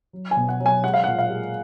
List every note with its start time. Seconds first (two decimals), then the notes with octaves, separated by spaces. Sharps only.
0.13 F#3
0.31 G#5
0.37 B2
0.49 F#5
0.60 F#3
0.66 G#5
0.84 G#3 F#5
0.94 F5
1.04 A#2 F#5
1.18 F5
1.30 G#3